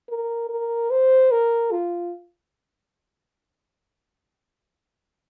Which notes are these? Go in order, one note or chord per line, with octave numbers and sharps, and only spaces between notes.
A#4
A#4
C5
A#4
F4